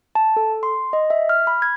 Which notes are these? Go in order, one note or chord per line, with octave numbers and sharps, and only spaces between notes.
A5
A4
C6
D#5
E5
F6
B5
G#6